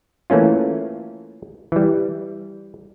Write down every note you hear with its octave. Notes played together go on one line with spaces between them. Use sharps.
E3 A3 A#3 C#4 F4
E3 G3